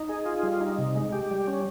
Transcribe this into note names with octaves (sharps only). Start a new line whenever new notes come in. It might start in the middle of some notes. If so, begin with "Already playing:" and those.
Already playing: D#4
G#4
F4
G3
D#4
C3
G#3
G4
G3
C#4